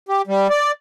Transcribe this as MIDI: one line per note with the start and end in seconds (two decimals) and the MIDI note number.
0.09 0.22 67
0.27 0.47 55
0.50 0.72 74